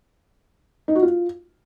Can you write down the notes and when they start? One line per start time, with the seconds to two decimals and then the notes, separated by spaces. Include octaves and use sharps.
0.88 D#4
0.95 F#4
1.03 F4